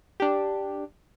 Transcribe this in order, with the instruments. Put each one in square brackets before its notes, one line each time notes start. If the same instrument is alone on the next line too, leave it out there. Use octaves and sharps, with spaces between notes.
[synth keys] D4 G4